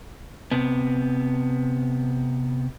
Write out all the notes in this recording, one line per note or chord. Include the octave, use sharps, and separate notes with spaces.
C3 B3